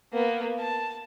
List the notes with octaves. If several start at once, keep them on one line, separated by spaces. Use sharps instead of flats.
A#3 B3
A5